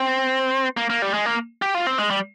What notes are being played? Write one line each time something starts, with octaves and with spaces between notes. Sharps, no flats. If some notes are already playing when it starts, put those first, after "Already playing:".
Already playing: C4
A#3
A#3
G3
G#3
A#3
G4
F4
C4
G#3
G3